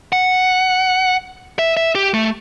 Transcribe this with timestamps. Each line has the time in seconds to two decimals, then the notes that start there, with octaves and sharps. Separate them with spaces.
0.13 F#5
1.59 E5
1.77 E5
1.95 G4
2.14 A3